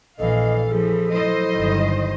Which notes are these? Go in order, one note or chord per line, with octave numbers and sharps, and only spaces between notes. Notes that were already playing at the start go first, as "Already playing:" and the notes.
A#1 E3 A4 D#5 F5
E3 F3 G#4
F#3 E4 C5 D#5
G1 D#3